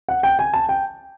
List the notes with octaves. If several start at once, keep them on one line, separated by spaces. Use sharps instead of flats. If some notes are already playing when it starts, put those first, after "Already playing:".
F#5
G5
G#5
A5
G5